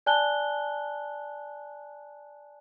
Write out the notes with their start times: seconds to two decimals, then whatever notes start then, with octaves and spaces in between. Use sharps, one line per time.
0.06 D5 G#5 A5 F#6 G7